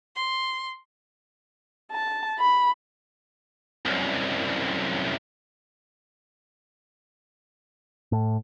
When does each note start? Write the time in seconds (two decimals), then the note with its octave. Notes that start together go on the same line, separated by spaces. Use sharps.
0.16 C6
1.92 A5
2.40 B5
3.85 C2 F#2
8.12 A2